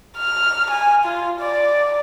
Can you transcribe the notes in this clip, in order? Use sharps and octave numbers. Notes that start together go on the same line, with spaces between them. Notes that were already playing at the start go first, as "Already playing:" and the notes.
F6
G#5
F4
D5